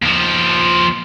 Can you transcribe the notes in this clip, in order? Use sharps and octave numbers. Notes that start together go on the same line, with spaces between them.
D#2 F3